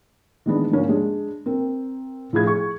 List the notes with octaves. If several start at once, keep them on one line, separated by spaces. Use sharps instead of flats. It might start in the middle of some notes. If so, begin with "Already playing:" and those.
D#3 E3 G#3 B3 D4
G#2 D3 A#3 C#4
G#3 D4
C4 A#4
A2 F3 E4 G#4 G#6
G#4 C#6